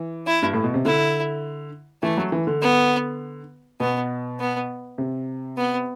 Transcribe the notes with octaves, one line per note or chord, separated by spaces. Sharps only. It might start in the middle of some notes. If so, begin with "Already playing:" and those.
Already playing: E3
E4
G2
A2
B2
C3
D3 E4
E3 A3
F#3
E3
D3
B3
B2 B3
B3
C3
B3